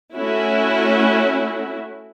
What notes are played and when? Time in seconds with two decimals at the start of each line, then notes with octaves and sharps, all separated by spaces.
0.15 A3 C#4 E4 F#4